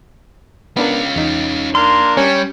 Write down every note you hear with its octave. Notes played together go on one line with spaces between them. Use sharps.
B3 C#4 D4 F4 A#4
E2 D#4
A#3 D4 A#4 C6
G3 C#4 C#5